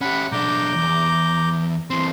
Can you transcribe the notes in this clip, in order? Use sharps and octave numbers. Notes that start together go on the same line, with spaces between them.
C#4 G4 F#5 B5
B1 D4 A#5 D6 G6
E2
E3 C4 C6